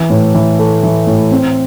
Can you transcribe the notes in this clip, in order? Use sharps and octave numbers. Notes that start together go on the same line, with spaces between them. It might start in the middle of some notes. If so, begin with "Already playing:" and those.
Already playing: E3
A2
E3
A3
E3
A2
C4